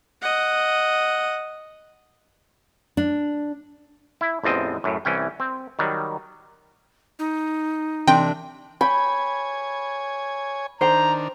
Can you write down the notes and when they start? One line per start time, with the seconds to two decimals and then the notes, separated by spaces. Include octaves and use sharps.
0.22 D#5 F#5
2.97 D4
4.21 E4
4.44 A1 E2 F3 C4 D#5
4.84 F#2 A2
5.05 C2 E3 C#4 G5
5.40 C4
5.79 D#3 F#3 G3
7.19 D#4
8.08 C3 E3 D4 G5 A5 C6
8.81 C#5 G5 G#5 B5
10.81 D#3 D4 C5 G5 A#5